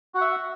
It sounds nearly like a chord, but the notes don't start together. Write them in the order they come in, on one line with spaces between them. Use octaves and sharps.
F#4 F#5 E5